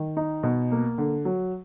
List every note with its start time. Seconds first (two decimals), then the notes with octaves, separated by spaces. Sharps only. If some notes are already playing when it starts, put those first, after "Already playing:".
Already playing: D#3
0.17 D#4
0.43 B2
0.72 A#3
0.98 D3
1.25 F#3